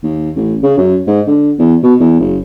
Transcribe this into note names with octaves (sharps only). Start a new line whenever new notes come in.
D#2
A1
C#3
F#2
G#2
D3
E2
B2
E2
F#1